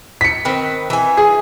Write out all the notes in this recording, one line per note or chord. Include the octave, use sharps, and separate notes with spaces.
B6 C#7
D#3 C4 B4
E3 G#5
G#4